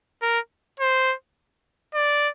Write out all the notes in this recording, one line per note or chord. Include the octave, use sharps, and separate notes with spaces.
A#4
C5
D5